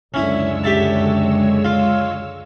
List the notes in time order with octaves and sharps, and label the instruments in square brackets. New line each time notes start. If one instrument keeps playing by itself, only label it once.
[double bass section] C#2 F#2 D3 [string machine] G#3 C#5 E6 [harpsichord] C#4 E4
[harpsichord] G4 E5 A5
F4